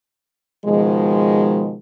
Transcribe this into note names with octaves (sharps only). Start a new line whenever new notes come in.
B2 D#3 F3 G#3